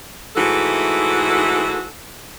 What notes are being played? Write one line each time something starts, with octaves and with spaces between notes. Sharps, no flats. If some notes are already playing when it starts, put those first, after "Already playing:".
G#2 E3 A3 F#4 A4